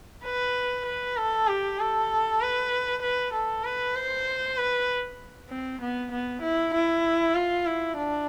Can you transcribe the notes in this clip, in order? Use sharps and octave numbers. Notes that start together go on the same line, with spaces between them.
B4
B4
A4
G4
A4
B4
B4
A4
B4
C5
B4
C4
B3
B3
E4
E4
F4
E4
D4